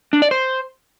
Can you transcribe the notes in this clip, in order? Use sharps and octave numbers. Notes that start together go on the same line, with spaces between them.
D4
D5
C5